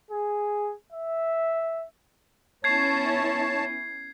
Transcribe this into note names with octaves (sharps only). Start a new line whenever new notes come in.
G#4
E5
B3 C#4 E4 C#5 A5 G#6 C7